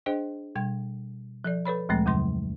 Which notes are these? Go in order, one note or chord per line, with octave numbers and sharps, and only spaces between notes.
D4 G#4 C5 D#5 G5
B2 G3 G5 G#6
F3 A4 D5
A4 B4 C#5 B5
D2 A#2 F3 G#3 A3 C4
F2 C#3 F#3 C6